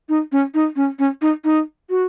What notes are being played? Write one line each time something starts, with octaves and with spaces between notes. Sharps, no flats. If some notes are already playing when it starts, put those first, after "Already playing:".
D#4
C#4
D#4
C#4
C#4
D#4
D#4
F#4